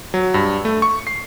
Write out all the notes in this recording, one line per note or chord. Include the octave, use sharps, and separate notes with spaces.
F#3
G2
A3
C#6
C7